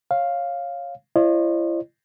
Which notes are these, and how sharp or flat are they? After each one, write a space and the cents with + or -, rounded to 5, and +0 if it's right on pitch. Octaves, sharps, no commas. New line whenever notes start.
C#5 -15 F5 +0
E4 +40 C5 +45 D#5 -45